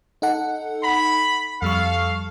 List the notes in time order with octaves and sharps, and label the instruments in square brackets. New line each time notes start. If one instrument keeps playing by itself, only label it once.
[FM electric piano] D#4 A4 F#5
[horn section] B5
[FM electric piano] F2 G3 C#6 [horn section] A4 F5